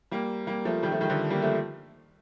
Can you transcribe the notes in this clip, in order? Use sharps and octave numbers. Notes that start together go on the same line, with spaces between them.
G3 A#3
G3 A#3
F3 A3
D#3 G3
F3 A3
D#3 G3
D3 F3
G3 A#3
F3 A3